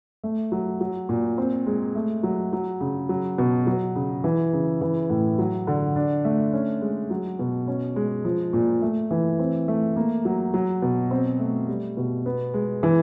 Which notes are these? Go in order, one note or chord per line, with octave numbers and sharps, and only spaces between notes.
A3
F#3
F#3
A#2
C4
G#3
A3
F#3
F#3
C#3
F#3
B2
F#3
C#3
E3
C#3
E3
A2
F#3
D3
D4
A3
C#4
G#3
F#3
B2
C#4
G#3
F3
A#2
A3
E3
C4
A3
A#3
F#3
F#3
B2
C4
A3
G3
B2
B3
G#3
E3